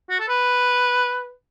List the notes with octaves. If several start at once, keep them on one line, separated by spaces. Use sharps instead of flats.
F#4
A4
B4